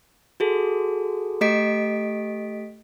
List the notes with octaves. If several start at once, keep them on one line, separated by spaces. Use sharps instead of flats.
F#4 G#4 A4
A3 G4 D#5 B6 D7